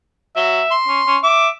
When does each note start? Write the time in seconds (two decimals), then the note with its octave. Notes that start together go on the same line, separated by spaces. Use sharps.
0.36 F#3 E5
0.71 C6
0.88 C#4
1.07 C#4
1.24 E5 D6